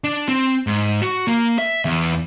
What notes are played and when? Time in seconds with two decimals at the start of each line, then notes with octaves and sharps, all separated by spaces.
0.04 D4
0.29 C4
0.67 G#2
1.02 F#4
1.27 A#3
1.58 E5
1.85 E2